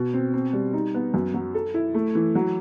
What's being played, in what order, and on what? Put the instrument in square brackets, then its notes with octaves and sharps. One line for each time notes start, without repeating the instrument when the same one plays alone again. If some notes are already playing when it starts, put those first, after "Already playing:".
Already playing: [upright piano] B2
C4
C4
G3
D#4
B3
F#2
F#3
A4
E4
A3
E3
F#3